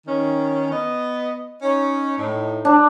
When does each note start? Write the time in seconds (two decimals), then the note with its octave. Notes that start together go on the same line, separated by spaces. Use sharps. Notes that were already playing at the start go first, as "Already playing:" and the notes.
0.06 D#3 C#4
0.70 B3 D#5
1.62 C#4 D#4
2.17 A2 D#4
2.65 D4